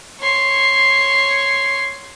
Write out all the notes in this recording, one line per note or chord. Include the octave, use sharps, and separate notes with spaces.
C#5 C6